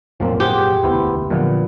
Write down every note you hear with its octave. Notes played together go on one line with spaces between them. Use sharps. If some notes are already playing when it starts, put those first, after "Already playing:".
G#1 F#2 A#2 F3 A#3 C4
G4 G#4 C5 F#5
E1 D2 B3 E4 C5
A#2 D3 F3 F#3 B3